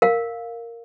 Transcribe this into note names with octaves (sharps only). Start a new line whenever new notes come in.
A#4 F5